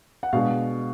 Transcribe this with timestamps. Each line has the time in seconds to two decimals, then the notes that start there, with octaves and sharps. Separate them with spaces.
0.23 F#5
0.33 B2 G#3 D4 F5